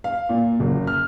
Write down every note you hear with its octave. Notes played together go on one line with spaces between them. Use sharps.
F5
A#2
F#1
F6